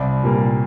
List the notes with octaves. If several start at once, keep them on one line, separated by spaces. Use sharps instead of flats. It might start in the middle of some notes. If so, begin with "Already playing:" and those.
Already playing: C2 D5
A#2 G3 A#3